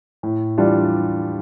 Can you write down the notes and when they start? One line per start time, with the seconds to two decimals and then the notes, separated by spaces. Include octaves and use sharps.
0.23 A2
0.58 E3 G3 D4 F4